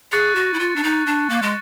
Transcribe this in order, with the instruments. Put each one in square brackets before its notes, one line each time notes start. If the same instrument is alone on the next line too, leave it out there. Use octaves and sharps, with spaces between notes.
[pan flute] G#4 [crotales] C#6 F#6 A6 C#7
[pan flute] F#4
E4
F4
D4
D#4
D4
A#3
G#3